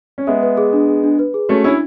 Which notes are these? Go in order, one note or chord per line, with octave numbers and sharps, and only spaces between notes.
C#4
G#3 B3 E5
B4
G#4
D4
G#4
D4
B4
G#4
A3 C#4 F#4
C#4 D4 E4